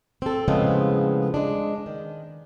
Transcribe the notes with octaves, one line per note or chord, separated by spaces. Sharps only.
C4 A4
A2 C#3 F3 G#3 B3 C4
G#3 D4
D#3